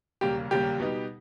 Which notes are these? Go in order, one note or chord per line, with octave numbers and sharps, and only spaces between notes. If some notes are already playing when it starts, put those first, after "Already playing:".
E1 D#2 C#3 G3 A#3 G4
E1 D#2 C#3 G3 A#3 G4
B2 G3 B3 D#4